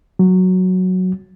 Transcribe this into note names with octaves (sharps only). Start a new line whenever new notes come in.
F#3